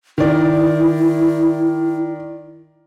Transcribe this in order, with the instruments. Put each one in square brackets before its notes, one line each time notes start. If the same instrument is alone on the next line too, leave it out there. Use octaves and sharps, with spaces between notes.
[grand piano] D#3 D5 [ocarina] E4